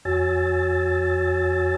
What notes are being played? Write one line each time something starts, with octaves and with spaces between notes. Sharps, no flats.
F2 F#4 C#5 G#5 E6 A6